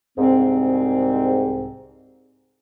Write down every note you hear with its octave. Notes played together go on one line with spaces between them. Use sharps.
C2 G#2 C4